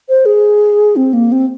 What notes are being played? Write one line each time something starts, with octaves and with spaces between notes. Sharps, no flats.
C5
G#4
C4
A#3
C4